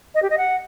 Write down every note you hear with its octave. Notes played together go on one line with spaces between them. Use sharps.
D#5
G4
D#5
F#5